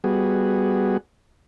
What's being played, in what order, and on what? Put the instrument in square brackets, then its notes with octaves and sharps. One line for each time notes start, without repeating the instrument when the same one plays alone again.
[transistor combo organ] G3 B3 F#4 G#4